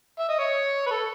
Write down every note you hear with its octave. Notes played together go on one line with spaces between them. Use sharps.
E5
D#5
C#5
B4
A4